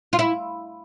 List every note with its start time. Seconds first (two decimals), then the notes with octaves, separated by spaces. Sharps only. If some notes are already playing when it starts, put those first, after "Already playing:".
0.13 F4
0.19 E4